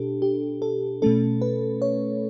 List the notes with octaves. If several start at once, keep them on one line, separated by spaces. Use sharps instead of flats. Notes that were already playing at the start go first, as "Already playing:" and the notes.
Already playing: B2 D4 G4 A4
G4
A4
B2 A3 C#4 A4
B4
C#5